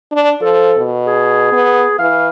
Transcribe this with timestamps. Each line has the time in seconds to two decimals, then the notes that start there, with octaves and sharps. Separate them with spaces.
0.12 D4
0.41 F3 A4
0.77 B2
1.06 G#4
1.52 B3
1.99 E3 F5